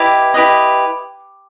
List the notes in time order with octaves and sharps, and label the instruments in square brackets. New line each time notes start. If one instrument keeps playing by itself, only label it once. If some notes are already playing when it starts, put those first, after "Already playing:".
Already playing: [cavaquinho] E4 G4 B4 D#5 D6
E4 G4 B4 D#5